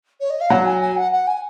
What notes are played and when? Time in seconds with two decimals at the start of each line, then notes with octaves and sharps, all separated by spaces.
0.20 C#5
0.30 D#5
0.40 F5
0.50 F#3 F#5
0.65 G#5
0.81 G#5
0.96 F#5
1.12 F#5
1.27 G#5